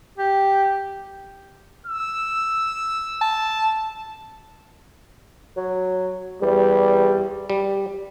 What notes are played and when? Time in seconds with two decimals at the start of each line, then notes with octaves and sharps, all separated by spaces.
0.18 G4
1.87 E6
3.21 A5
5.56 F#3
6.41 E2 G3
7.50 G3